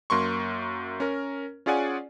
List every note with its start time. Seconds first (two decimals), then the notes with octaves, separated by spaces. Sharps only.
0.10 F#2 A#3 C6 C#6
1.00 C#4 A#4
1.66 C#4 F4 G#4 D5 F#5 G#5